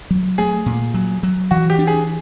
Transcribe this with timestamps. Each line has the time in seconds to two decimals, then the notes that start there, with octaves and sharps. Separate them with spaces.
0.11 F#3
0.38 A3 G#4
0.66 A#2
0.94 F#3
1.23 F#3
1.51 E3 F#4
1.70 G4
1.79 D4
1.87 G#4